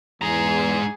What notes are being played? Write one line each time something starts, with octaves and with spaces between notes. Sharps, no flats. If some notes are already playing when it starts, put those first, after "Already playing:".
E2 G#2 G#4 A#5